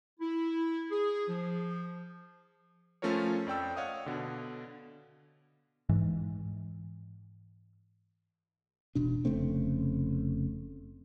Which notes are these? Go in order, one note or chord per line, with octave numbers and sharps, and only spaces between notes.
E4
G#4
F3
F3 A3 C#4 F4 A#4 C#5
F2 D5 G5 E6
C#5 D#5 F5 F#5 D#6
B2 D3
G#2 E3
E1 B2 D4
F1 C#3 A3 C4